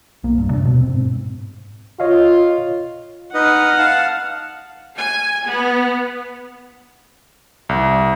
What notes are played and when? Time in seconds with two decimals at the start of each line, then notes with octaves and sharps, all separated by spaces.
0.24 B1 A#3
0.38 G2
0.50 D#1 C3 D4
0.65 B2
0.81 C4
0.94 G#2
2.00 F4 C#5 D#5 F5
3.34 D#4 B4 D#5 F#5 F6
3.78 F5 A5
4.98 G#5
5.49 B3
7.69 C2